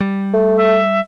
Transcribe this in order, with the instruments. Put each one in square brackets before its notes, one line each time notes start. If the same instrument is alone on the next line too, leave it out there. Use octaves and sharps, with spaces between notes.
[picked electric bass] G3
[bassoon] A3
[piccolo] E5